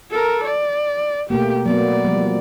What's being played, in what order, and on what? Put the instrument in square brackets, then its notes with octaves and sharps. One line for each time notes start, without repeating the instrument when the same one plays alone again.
[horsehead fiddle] A4 A#4
D5
[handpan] B2 A3 A#3 [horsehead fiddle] G4
[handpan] F#3 A#3 B3 [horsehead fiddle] D5
[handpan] F3 G3